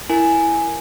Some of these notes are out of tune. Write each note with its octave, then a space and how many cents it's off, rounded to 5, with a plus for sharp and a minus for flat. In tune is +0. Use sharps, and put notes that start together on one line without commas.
E4 +0 A#4 +0 G#5 +0